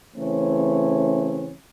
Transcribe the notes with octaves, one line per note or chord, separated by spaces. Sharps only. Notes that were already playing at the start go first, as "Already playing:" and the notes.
C#3 E3 A3 C4 C#4